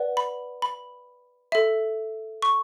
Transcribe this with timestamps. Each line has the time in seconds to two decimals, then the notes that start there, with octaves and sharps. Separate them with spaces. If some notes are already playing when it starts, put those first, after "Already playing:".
Already playing: B4 D5 F#5
0.17 B5
0.62 B5
1.52 A4 E5
2.42 C#6